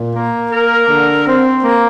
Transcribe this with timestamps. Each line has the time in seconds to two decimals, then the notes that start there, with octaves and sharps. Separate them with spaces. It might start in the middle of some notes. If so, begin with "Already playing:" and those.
Already playing: A#2
0.14 A#3
0.52 A#4
0.89 D3
1.27 C4
1.64 A#3